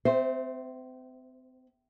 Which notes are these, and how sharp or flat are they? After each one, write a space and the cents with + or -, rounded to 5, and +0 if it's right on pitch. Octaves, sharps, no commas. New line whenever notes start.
C4 -35 C5 +0 E5 +0